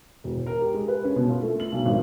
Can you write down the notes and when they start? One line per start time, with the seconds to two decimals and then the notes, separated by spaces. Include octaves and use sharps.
0.24 E1
0.46 A#4
0.60 G4
0.74 G#3
0.88 B4
1.04 C#4
1.16 B2
1.29 F4
1.42 A3
1.60 F#7
1.72 B1
1.86 G#1